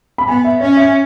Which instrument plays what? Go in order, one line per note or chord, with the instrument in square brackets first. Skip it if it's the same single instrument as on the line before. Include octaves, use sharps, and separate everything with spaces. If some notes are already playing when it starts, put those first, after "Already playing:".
[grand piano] B5
[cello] B3 [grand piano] G#5
[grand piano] E5
[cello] C#4 [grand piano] C#5
[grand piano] E5